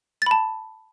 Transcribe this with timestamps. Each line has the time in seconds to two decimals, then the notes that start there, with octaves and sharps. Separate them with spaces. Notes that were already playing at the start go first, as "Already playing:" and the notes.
0.22 A6
0.26 B5
0.31 A5